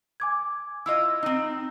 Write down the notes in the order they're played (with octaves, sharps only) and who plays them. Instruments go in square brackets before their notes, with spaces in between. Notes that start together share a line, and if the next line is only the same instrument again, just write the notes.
[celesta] G#5 D6 G#6
[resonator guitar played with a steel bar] E4 F4 D#5 [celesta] E6
[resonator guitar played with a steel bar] C4 D#4